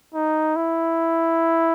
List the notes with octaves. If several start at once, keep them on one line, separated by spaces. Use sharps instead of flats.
D#4
E4